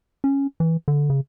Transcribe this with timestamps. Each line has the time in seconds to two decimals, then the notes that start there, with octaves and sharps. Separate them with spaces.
0.24 C#4
0.60 E3
0.88 D3
1.10 C#3